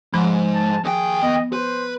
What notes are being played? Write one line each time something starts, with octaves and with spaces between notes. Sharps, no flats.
G#2 F3 B5
A5
D#2 G#4 G5
B3 D#5
B4 C5